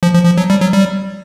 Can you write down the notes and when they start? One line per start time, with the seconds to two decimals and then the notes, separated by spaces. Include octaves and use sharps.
0.03 F3
0.14 F3
0.25 F3
0.38 F#3
0.50 G3
0.61 F#3
0.73 G3